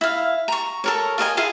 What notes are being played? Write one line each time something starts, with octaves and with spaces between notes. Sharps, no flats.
E4 F5
A#5 C#6
A4 A#4 C#5
F4 A#4 D#5 G#5
E4 F4 G#4 F5